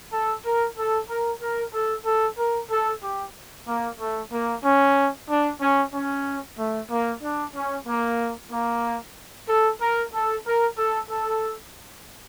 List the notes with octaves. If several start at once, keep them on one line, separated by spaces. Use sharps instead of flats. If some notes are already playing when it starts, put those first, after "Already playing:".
A4
A#4
A4
A#4
A#4
A4
A4
A#4
A4
G4
A#3
A3
A#3
C#4
D4
C#4
C#4
A3
A#3
D4
C#4
A#3
A#3
A4
A#4
A4
A#4
A4
A4